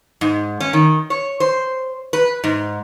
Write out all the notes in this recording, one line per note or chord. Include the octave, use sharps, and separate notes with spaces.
G#2
C#4
D#3
C#5
C5
B4
G#2